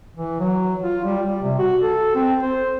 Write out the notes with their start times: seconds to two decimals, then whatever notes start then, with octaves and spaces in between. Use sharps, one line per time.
0.16 E3
0.40 F#3
0.84 F4
1.04 G3
1.26 G3
1.42 C3
1.58 F#4
1.82 A4
2.15 C4
2.42 C5